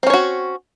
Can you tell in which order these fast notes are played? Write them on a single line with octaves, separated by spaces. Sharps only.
C4 C#4 C#5 F#4